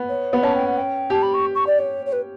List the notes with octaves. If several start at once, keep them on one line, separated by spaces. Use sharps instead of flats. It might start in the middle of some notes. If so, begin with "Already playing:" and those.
Already playing: B3
C#5
B3
C#4 A5
G5
F#5
G5
G4 A5
B5
C#6
C#6
D5
C#5
C#5
B4